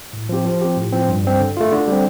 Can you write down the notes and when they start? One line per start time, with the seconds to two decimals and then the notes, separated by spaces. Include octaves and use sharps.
0.13 A2
0.29 F3 C4 G4
0.45 F3
0.62 C4 G4
0.77 A2
0.92 F3 C4
1.09 G2
1.24 G3 C4
1.40 D3
1.57 A3 F4
1.72 D3
1.88 G3 C4